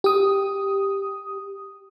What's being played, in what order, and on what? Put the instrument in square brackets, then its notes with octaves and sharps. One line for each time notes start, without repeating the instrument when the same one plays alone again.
[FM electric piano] G4 D#6